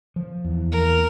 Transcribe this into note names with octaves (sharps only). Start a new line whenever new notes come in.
F3
E2
A#3 A#4